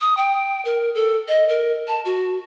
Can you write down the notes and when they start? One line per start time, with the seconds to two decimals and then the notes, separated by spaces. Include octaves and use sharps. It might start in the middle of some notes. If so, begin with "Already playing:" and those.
0.01 D#6
0.17 G5
0.65 A#4
0.95 A4
1.28 D#5
1.49 A#4
1.88 A5
2.05 F#4